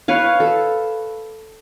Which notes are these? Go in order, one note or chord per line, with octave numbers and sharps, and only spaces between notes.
B4 C#5 F5
A4